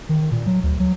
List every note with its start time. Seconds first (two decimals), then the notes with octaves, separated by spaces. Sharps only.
0.09 D#3
0.31 A#2
0.47 F#3
0.63 D2
0.80 F#3